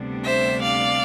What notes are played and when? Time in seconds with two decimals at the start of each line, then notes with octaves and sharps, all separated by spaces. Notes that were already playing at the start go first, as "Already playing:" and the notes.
Already playing: D2 C3 G3 B3 D4
0.24 C5 E5
0.62 D5 F5